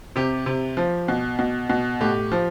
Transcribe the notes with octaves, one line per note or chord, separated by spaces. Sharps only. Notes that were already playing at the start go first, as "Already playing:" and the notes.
C3 G4
C3
F3
B2
B2
B2
A2 G4
F3